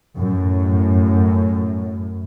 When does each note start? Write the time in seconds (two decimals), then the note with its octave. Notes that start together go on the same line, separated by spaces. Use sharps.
0.18 F#2 A2